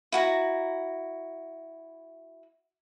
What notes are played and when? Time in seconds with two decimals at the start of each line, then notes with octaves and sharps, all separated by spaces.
0.12 E4 F#4 A#5